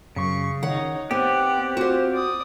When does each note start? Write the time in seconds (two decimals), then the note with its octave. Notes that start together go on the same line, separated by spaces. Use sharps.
0.16 F#2 C#3 C#6
0.63 D#3 D#4 C#5 F#5
1.11 B3 C4 G4 D5 F#5
1.77 F4 F#4 C5
2.11 D5 D#6